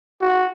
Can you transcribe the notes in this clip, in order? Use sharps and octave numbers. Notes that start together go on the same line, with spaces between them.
F#4